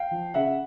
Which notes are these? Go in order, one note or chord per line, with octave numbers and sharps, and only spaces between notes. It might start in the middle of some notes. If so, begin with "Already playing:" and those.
Already playing: F5 G5
F3
C#3 E5 F#5